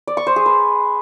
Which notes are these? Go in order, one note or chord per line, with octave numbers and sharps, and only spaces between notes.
D5
C#6
C5
G#4
B4